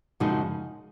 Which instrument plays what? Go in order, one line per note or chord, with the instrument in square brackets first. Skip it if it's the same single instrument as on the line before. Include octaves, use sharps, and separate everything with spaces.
[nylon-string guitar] F#2 C#3 F3 G#3 D#4